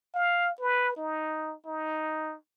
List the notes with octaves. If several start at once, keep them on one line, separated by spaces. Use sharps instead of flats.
F5
B4
D#4
D#4